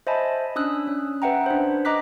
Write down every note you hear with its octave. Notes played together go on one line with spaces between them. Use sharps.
C5 D#5 E5 G#5 A5 B5
C#4 D4 D#6 E6 F#6
C#4
B4 E5 F#5 G5 A#5
D4 C5
D#5 A#5 D6 F#6 B6